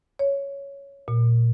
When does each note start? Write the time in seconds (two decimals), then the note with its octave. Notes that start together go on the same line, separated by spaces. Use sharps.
0.19 C#5
1.08 A#2